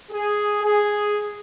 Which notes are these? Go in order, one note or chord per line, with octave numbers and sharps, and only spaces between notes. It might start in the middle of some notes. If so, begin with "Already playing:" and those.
G#4
G#4